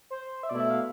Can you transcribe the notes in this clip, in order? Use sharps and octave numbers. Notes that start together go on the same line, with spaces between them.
C5
E5
B2 A3 E4 D5
E5
F5